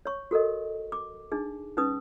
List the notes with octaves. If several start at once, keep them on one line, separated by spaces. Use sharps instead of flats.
C#5 C#6
F#4 A4 A#4 D#5
D6
D4 D#4 G#4
C#4 D#4 B4 D#6